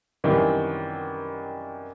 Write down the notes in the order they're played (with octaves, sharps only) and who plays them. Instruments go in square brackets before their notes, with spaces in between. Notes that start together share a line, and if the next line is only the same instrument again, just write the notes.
[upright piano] F#2 C3 D#3 E3 G3